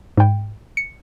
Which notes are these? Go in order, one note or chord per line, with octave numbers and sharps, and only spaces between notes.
G#2 G5
C#7